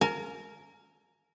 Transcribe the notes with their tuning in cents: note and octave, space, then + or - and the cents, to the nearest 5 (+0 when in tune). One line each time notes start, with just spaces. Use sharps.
A#4 -10 G#5 +40